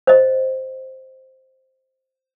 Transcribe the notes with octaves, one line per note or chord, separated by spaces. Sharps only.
C5 D#5